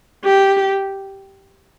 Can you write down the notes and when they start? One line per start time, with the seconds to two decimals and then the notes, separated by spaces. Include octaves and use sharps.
0.25 G4